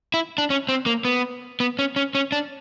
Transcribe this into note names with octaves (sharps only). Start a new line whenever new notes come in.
E4
D4
C#4
C4
A#3
B3
B3
C#4
C#4
C#4
D4